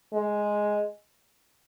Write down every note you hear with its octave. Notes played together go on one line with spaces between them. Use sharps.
G#3